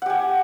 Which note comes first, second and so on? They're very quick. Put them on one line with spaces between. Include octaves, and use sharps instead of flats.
F#5 G4 G#5